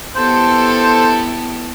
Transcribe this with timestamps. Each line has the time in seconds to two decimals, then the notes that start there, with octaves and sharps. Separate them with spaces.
0.16 B3 E4 G4 A4 C5